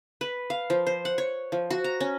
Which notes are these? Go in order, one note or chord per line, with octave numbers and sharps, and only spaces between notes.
B4
F5
F3
C5
F#5
C#5
F3
F#4
A#5
C#4